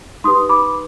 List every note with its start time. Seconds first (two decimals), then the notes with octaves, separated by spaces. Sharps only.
0.24 D#4 G4 B4 C6 D#6
0.49 B5 D6